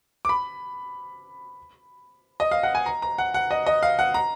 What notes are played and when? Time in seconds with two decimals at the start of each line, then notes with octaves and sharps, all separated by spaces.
0.25 D6
0.29 B5
2.40 D#5
2.51 F5
2.63 F#5
2.75 G#5
2.86 A#5
3.02 A#5
3.18 F#5
3.34 F#5
3.51 D#5
3.67 D#5
3.83 F5
3.99 F#5
4.14 A#5